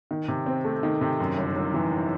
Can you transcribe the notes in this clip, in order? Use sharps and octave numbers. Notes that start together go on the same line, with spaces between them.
D#3
C3
C4
A3
D#3
C3
F#2
G1
G1
E3